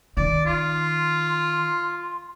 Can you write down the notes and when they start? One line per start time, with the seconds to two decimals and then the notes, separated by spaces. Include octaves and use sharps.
0.17 D#3 D5
0.46 F4 C6